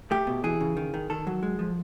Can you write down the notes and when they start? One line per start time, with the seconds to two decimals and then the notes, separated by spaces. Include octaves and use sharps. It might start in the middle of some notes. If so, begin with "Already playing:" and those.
0.11 A3 G4
0.27 B2
0.44 E3 G#4
0.61 C#3
0.77 D#3
0.94 D#3
1.10 D#3 A4
1.27 F#3
1.43 G#3
1.59 F3